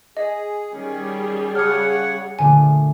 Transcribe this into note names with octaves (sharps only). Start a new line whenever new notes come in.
G#4 D#5
D#3 G3 C#4 G#4
C#3 C#5 F#5 A5 D#6 F6
A#2 D3 F3 A3 G#5